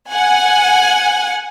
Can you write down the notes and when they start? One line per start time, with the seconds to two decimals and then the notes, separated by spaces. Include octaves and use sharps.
0.11 F#5 G#5